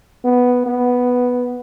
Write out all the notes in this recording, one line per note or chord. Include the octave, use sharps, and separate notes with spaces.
B3
B3